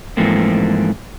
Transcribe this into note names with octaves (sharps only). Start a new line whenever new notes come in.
G#2 E3 F3 A3 A#3 C4